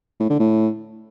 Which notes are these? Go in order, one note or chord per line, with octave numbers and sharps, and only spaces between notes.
A2
D3
A2